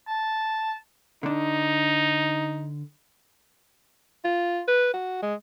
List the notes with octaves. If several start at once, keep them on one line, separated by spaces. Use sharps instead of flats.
A5
D3 D4 D#4
F4
B4
F#4
G#3